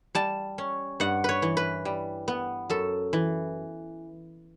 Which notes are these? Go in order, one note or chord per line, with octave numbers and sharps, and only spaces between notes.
G3 A5
C#4
G2 F#5
B4 C#5
E3
B4
G3
B3
F#2 A4
E3